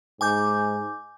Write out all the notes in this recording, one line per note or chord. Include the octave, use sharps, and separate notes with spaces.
G#2 G#5 D6 G6